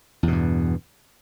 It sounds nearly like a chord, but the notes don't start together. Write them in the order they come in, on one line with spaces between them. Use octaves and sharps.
E2 B2 G2